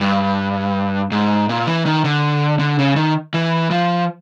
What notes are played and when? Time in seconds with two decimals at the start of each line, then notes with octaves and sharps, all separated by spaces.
0.01 G2
1.12 G#2
1.49 A#2
1.67 E3
1.86 D#3
2.05 D3
2.59 D3
2.79 C#3
2.96 D#3
3.34 E3
3.70 F3